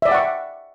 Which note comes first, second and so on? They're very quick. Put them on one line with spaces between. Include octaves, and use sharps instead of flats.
E5 D5 G5 F#5 C#6